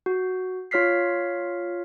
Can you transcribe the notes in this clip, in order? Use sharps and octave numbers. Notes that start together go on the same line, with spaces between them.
F#4
F4 C#5 F6 B6 C7